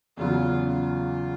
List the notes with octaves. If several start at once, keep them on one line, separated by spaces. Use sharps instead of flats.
E2 C#3 F#3 F4
F4